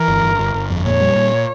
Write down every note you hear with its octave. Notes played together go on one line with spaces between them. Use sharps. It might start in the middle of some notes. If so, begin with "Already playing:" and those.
Already playing: E3 A#4
G1
G1
G1
G1
F2
A#2 C#5
G3
A#2